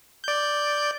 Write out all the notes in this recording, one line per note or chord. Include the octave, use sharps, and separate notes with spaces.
D5 G6